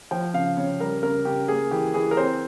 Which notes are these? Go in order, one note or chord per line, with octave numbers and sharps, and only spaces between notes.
F3 G5
C#3 F5
C#3 C#5
G3 A#4
C#3 A#4
C#3 G4
A#3 G#4
E3 G4
E3 G#4
A#4
C4 C5